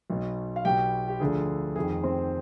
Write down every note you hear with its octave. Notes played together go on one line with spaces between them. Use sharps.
B1 B2
F5
B1 B2 G4 G5
G4
D2 D3 F3 G#4
F1 F2 D#3 G#4
C4 C5